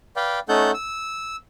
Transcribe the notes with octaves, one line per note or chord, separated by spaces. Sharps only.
B4 D5 F5 G5
A3 C#4 D#4 A4 F#5 G6
E6